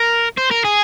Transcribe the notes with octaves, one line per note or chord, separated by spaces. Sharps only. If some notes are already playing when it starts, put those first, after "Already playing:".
Already playing: A#4
C5
A#4
G#4